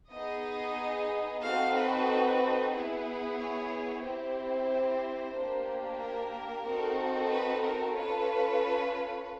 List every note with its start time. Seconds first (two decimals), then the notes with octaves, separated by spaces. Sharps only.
0.11 B3 D#4 G#4 D#5
1.42 C4 D#4 F#4 A4 F5
1.74 B4
2.72 B3 E4 G#4 B4
3.37 C#5
4.02 C4 E4 G4 C5
5.33 A#3 D4 G4
5.99 A#4
6.64 C4 D#4 F#4 A4
7.29 B4
7.62 A#4
7.94 C#4 F4 A4 B4